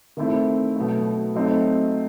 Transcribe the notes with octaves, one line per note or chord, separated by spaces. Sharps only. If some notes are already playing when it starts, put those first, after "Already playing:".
D#3 A3 C4 E4
B2 F#3 A3
F#3 A3 C4 D#4